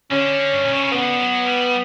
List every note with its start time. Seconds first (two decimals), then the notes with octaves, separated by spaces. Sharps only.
0.11 D3 C#4
0.53 G2
0.63 A#2
0.72 B2
0.82 C#3
0.92 D3 B3
1.19 F#3
1.45 G3